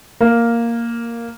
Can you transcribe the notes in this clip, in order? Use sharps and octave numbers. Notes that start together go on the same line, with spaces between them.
A#3